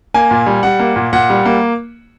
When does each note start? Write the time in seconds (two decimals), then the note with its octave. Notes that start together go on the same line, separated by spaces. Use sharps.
0.14 A#3 G#5
0.31 A#2
0.46 G3
0.63 G3 F#5
0.80 A#3
0.96 A#2
1.13 A#2 F#5
1.30 G3
1.45 A#3